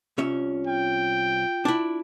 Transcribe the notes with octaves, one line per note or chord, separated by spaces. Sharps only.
C2 C#4 F4 E5
F4 G5
D4 E4